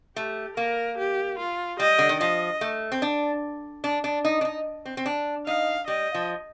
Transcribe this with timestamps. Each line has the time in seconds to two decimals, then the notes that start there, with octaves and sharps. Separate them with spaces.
0.16 A3 G4
0.57 A#3 A#4
0.98 G4
1.39 F4
1.79 G3 D#5
1.99 D3
2.09 D#3
2.20 F3 D#5
2.61 A3
2.92 C4
3.02 D4
3.84 D4
4.04 D4
4.25 D#4
4.41 D4
4.45 D#4
4.85 C4
4.97 C4
5.06 D4
5.46 D#4 F5
5.88 G3 D#5
6.14 F3